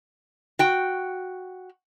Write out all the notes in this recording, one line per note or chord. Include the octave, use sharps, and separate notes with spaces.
F#4 G5